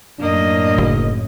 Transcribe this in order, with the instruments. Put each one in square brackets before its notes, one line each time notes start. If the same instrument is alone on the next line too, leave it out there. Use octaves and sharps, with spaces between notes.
[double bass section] F#2 A2 [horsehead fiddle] A#3 D#5 [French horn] D4
[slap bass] F#1